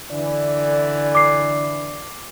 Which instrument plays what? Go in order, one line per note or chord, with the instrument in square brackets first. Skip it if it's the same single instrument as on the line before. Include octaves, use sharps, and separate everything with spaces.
[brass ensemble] D3 E3 D5
[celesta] D6 C7